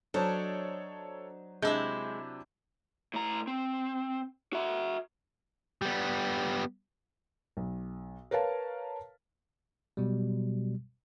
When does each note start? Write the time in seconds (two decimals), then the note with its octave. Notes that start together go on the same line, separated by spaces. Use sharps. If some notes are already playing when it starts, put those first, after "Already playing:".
0.14 F#3 D4 D#4 A4 C5 C#5 A5
1.62 C3 G#3 D4 E4 E5 G6
3.14 A2 A#5
3.47 C4
4.53 F#4 E5
5.82 G3 B3
7.57 B1
8.31 A#4 B4 C#5 F5 A5
9.97 B2 F#3 G3